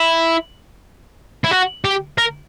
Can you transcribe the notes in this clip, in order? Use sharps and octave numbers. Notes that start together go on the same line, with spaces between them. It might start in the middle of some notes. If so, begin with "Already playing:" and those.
Already playing: E4
E4
F#4
G4
A#4